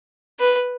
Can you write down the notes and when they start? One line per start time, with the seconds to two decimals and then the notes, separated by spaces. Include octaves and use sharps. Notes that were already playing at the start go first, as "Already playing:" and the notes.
0.39 B4